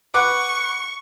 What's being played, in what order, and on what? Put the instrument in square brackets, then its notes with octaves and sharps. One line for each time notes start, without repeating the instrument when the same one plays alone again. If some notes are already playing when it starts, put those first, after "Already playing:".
[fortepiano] B4 F#5 D6 [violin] C#6